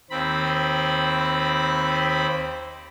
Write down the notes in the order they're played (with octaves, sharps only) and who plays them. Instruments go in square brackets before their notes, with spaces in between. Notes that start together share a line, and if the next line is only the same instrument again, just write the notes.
[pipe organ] D#2 C4 B5